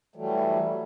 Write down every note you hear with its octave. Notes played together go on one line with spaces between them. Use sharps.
E3 F#3 G3 A3